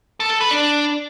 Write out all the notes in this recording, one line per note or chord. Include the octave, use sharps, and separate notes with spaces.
A4
A4
B4
D4